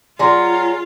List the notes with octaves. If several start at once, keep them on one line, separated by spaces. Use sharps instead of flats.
F#3 C#4 F4 G#4 D5 C6